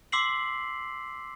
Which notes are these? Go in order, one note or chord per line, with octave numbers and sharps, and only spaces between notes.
C6 D6 E6 B6 C7 F#7